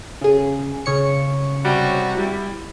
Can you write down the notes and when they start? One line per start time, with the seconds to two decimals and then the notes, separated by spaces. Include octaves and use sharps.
0.21 C#3 G#4
0.86 C#3 C#5 C#7
1.65 C3 G3 F#4
2.17 G3 E4